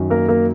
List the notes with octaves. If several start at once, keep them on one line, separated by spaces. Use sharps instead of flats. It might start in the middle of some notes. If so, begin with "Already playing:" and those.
Already playing: F#2 D#3 F#3
A#3 A#4
A#3 A#4